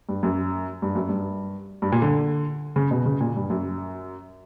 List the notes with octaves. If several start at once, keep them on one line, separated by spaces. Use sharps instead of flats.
G2
F#2
G2
F#2
G2
G2
A#2
D3
C#3
B2
C#3
A#2
G2
F#2